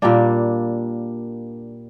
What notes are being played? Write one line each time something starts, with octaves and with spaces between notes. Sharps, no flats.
A#2 G3 A#3 D4